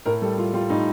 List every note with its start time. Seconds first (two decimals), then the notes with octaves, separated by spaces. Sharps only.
0.06 A2 A#4
0.22 G3 A4
0.37 G3 F4
0.53 G3 F4
0.70 A2 D#4